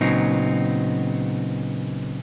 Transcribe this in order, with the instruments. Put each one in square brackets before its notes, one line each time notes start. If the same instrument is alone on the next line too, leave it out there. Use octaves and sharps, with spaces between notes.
[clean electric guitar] A#2 C#3 F#3 B3 C4 D#4